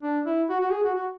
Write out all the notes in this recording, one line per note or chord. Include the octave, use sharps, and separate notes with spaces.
D4
E4
F#4
F#4
G#4
F#4
F#4